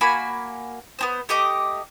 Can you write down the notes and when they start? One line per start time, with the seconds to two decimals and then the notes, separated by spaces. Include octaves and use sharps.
0.01 A#3 F#4 G#5 B5
0.99 B3 C4 C5
1.29 A3 G4 D#5 D6